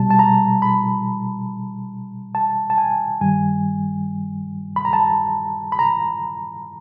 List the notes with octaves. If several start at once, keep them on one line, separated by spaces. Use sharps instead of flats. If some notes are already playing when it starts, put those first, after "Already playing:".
Already playing: B2 G3 A5
A5
A#5
B5
A5
A5
G#5
G2 D#3 G3 G#5
B5
A#5
A5
B5
A#5